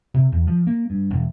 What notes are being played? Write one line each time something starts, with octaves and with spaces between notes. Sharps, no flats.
C3
E2
F3
A#3
G2
E1